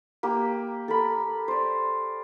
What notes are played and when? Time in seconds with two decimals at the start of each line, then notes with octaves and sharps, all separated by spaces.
0.23 A#3 G4
0.88 A4 A#4 B5
1.48 C5 D5